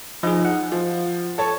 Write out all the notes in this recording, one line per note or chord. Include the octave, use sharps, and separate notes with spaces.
F3 D#4 G#4
F#5
F3
A4 C#5 A5